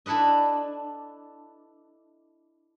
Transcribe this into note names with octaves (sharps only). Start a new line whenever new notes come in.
D4 E4 A4 B4 D#5